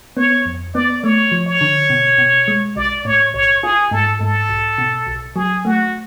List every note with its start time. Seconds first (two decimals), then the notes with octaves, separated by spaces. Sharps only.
0.17 B3 C#5
0.46 F2
0.74 B3 D5
1.03 A3 C#5
1.32 F3
1.46 C#5
1.61 D3
1.90 B2
2.18 B2
2.48 G#3
2.76 B1 D5
3.05 A2 C#5
3.34 B1 C#5
3.63 F4 G#4
3.91 G#2 A4
4.20 G#2 A4
4.49 B1
4.78 B2
5.07 B1
5.36 F#3 G#4
5.65 A3 F#4